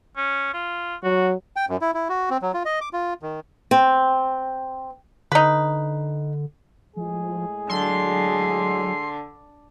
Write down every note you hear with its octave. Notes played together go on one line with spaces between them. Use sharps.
C#4
F4
F#3 F#4
G5
F#2
E4
E4
F#4
C4
F#3
F4
D#5
D6
F4
D#3
C4
D3 D#4 B4
A2 F3 G#3 G#4
D3 F#3 C6